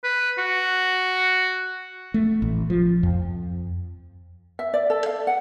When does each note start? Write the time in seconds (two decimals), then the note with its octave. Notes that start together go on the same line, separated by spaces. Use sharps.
0.04 B4
0.38 F#4
2.14 A3
2.42 A1
2.70 F3
3.03 F2
4.59 E5
4.74 D5
4.90 A4
5.06 F5
5.27 F#5